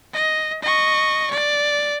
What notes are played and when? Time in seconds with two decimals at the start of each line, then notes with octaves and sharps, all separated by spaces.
0.13 D#5
0.62 D#5 C#6
1.31 D5